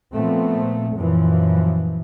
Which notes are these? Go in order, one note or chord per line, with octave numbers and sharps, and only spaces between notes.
A#2 F3 A3 B3 C4
F#2 A#2 E3 F3